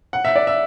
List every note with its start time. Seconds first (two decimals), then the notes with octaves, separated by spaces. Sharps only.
0.13 F#5
0.25 E5
0.36 D5
0.47 E5